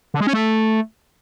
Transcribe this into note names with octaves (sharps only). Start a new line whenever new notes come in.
D3
G#3
C#4
A3